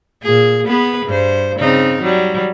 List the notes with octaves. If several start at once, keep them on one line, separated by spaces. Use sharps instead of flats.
A#2 G#4
B3 G#4 B4
G2 C5
C#3 C4 D#4
F#3 G3